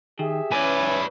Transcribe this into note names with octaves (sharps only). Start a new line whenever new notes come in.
D#3 G4 G#4 E5
E3 C#4 E4 B4 D5 G#5